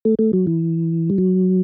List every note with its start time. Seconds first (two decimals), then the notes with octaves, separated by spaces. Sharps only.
0.05 A3
0.19 A3
0.33 F#3
0.47 E3
1.10 G3
1.18 F#3